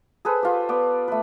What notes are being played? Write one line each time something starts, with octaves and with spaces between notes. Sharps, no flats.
G#4 A4 B4 C5
F4 G4
B3 D5
A3 B4